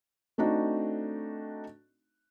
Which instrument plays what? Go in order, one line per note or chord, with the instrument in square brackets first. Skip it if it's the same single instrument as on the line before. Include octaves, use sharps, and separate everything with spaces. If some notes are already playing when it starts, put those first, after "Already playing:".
[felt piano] A3 C4 D4 D#4 F#4